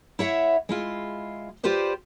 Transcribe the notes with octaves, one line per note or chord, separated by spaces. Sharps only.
E4 C#5 E5 F#5
G#3 E4 F4
F4 G4 B4 C5 D5